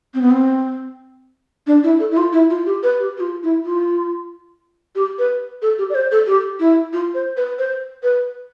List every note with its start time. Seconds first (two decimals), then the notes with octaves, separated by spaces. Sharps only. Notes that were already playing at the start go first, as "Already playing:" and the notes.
0.14 C4
0.22 B3
0.31 C4
1.67 D4
1.84 E4
2.00 A4
2.11 E4
2.17 F4
2.33 E4
2.50 F4
2.66 G4
2.83 B4
2.99 G4
3.17 G4
3.20 F4
3.43 E4
3.65 F4
4.95 G4
5.18 B4
5.62 A4
5.78 G4
5.90 D5
5.95 C5
6.11 A4
6.27 G4
6.60 E4
6.93 F4
7.14 C5
7.37 B4
7.58 C5
8.03 B4